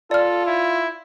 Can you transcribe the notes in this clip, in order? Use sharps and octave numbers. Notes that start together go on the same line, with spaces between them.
F4 A4 D5 F6
E4